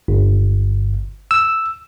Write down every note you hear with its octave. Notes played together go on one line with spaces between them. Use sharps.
G1
E6